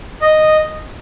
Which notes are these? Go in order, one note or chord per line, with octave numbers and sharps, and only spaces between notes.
D#5